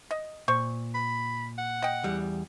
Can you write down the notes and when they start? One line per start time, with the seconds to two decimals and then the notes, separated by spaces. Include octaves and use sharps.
0.11 D#5
0.48 A#2 C5 C#6
0.95 B5
1.58 F#5
1.82 D#5 G5
2.04 E2 G3